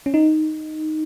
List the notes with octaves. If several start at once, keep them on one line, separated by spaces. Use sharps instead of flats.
C#4
D#4